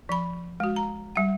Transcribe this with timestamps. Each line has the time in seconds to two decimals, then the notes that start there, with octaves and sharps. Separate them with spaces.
0.09 F3 B5
0.60 G#3 F#4
0.76 A#5
1.16 G3 F#5